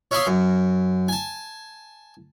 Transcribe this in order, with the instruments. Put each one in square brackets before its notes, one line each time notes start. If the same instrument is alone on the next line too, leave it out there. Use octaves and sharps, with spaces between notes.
[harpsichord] C#5 E5 F5 B5 C6 D#6
F#2
G#5 A5